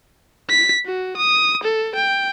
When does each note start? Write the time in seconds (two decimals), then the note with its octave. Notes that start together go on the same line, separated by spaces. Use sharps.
0.49 B6
0.86 F#4
1.17 D#6
1.63 A4
1.95 G5